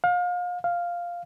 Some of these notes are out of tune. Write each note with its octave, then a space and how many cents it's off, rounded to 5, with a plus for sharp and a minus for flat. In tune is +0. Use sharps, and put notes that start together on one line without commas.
F5 +35
F5 +0